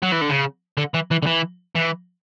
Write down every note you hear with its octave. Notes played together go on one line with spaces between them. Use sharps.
F#3
E3
D3
C#3
D3
E3
E3
D3
E3
E3